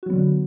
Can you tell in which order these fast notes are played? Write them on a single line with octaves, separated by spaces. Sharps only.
F#4 F#3 B3 D3